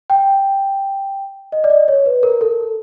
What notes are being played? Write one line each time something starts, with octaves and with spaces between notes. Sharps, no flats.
G5
D#5
D5
D#5
C#5
B4
A#4
A4